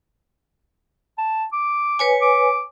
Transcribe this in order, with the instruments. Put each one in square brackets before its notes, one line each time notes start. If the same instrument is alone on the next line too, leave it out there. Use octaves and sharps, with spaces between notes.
[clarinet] A5
D6
[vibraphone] B4 C#5 G#5
[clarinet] D6